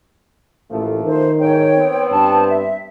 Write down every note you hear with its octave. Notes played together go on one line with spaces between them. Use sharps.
A1 F3 A3 A#3
D#3 C5
A1 G#2 C#5 G5
B3 C4
G2 A5
E5